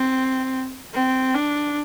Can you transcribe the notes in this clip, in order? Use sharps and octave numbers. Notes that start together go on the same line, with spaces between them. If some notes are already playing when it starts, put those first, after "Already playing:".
Already playing: C4
C4
D4